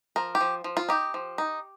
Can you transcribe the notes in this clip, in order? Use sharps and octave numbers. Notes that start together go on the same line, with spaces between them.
F3 A#4
G4
F3
F3
F4
D#4 G4
F3
D#4